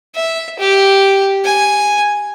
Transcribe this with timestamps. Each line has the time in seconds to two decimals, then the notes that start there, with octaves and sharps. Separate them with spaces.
0.15 E5
0.59 G4
1.44 G#5